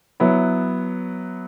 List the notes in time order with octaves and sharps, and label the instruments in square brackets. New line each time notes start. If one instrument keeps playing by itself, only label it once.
[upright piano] F#3 B3 E4